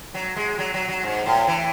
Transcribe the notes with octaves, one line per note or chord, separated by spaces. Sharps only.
F#3
G#3
F#3
F#3
F#3
G#2
A2
E3